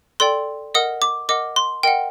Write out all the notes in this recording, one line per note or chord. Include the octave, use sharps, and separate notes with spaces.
A4 D5 G5 C6
A#4 D#5 F#5 D#6
D6
A#4 D#5 F#5 D6
C6
A#4 D#5 F#5 G5